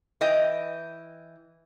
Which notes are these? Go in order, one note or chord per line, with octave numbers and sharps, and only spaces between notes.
E3 D#5 G5